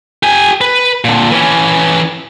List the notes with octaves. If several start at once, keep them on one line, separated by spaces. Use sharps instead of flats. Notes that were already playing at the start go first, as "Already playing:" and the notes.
G4 G#5
B4
A#2 D3
E3 C#4